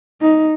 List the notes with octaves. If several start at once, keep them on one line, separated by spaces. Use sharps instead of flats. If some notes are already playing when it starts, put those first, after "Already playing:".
D#4